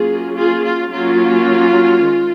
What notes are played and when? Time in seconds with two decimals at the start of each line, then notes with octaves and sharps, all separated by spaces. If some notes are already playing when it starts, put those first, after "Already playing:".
Already playing: F#3 A#3 C#4 F4 G#4
0.35 F4 G#4
0.64 F4
0.91 F#3 A#3 C#4 F4
2.04 D#3 G#3